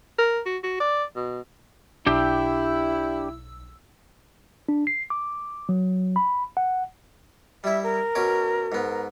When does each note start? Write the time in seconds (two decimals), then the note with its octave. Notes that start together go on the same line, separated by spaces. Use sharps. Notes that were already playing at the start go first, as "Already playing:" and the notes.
0.18 A#4
0.46 F#4
0.63 F#4
0.80 D5
1.16 B2
2.06 B1 D4 E4 G4 G5 E6
4.69 D4
4.87 C7
5.10 D6
5.69 F#3
6.16 B5
6.57 F#5
7.64 G3 E4 E5
7.83 A#4
8.15 B2 C#4 D6
8.72 G#2 B3